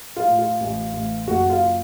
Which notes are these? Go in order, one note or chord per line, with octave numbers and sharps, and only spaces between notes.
F4
A2
F4
A1
A1
F#1 F#4
F4